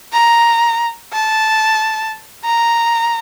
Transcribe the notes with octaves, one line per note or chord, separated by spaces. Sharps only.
A#5
A5
A#5